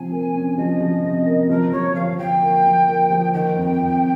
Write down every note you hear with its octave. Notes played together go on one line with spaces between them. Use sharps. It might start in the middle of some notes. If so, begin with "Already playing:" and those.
Already playing: C3 F3 G#5
A#3
C#4
F3 D#5
F3
C3
A#3
F3 A#4
F3 C#5
F3 F5
F3 G5
A#3
F3
A#3
F3
D#3 G5
F2
F2